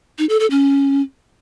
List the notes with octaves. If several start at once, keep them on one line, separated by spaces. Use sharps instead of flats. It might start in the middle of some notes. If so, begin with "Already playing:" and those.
D#4
A4
A4
C#4